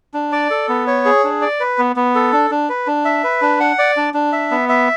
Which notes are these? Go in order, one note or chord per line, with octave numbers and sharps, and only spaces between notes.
D4
D5
A4
B3
C#5
G#4
D4
D5
B4
B3
B3
A4
D4
D4
B4
D4
E5
B4
D4
F#5
D5
D4
D4
E5
B3
E5